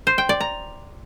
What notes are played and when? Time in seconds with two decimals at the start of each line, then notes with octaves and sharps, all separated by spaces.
0.07 C5
0.18 G5
0.29 D5
0.40 A#5